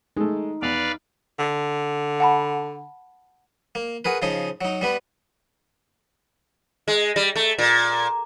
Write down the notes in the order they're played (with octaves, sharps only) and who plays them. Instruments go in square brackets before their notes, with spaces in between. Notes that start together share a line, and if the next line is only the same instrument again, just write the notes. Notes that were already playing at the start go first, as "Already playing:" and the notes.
[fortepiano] G#3 A3 [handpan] D#4
[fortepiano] E2 [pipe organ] B4 D5 F5
[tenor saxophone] D3
[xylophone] F#5 A5 B5
[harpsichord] A#3
F#4 G#4 A#4 B4
C#3 F3 D#4 G#4
F#3 D#4
G3 B3 B4
[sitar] G#3
G3
A3
A#2